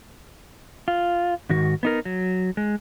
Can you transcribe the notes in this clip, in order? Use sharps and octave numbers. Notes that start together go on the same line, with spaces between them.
F4
G#2 D#3 F#4
B3 D#4 A#4
F#3
G#3